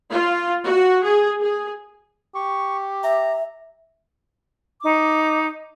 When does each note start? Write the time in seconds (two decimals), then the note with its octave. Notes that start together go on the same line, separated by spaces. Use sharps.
0.11 F4
0.64 F#4
1.03 G#4
1.41 G#4
2.35 G4 C#6
3.04 E5 A#5
4.82 D#4 D6